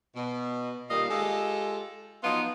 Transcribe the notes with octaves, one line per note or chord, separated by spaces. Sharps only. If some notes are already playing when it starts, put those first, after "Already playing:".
B2
A#2 D#3 G3 D#5 F5
G#3 F4 G4 A4
F3 F#3 B3 D#4 F4